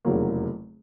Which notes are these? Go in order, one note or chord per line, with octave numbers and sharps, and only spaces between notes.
F1 E2 C#3 F#3 A#3